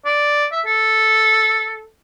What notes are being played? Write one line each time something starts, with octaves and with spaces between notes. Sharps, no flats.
D5
E5
A4